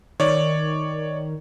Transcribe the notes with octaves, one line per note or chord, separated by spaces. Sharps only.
D#3 C#5 D5